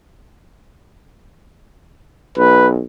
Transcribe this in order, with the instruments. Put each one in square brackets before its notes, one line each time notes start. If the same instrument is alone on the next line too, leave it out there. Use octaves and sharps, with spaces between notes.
[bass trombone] B1 [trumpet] B4